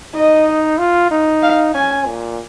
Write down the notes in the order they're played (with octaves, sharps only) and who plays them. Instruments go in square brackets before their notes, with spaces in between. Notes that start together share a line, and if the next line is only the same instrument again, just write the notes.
[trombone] D#4 [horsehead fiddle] D#5
[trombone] F4
D#4
[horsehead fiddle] F5
[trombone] C#4 [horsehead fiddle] G#5
[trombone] A#2